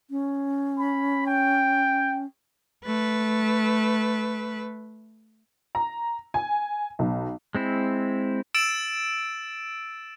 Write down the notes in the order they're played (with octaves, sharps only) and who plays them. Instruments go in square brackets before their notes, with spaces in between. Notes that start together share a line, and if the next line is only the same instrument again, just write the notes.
[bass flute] C#4
[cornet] B5
G5
[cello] A3 B4
[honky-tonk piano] A#5
G#5
B1
[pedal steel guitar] G#3 C4 E4
[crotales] E6 A6 D7 E7